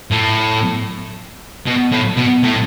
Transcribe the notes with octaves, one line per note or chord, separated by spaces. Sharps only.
A2
B2
A2
B2
A2